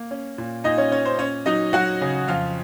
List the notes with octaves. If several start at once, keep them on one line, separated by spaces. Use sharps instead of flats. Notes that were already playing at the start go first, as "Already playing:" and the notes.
Already playing: A#3
C#4
A#2
A#2 D#4 D#5
C#4 C#5
C#4 C#5
C5
C#4 C#5
F#3 D#4 D#5
F#3 F#4 F#5
C#3
F2 F4 F5